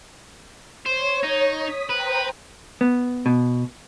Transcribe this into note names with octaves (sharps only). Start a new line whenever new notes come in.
C5 C#5
D#4
D#6 B6
B4 C5 G5 A#5
B3
B2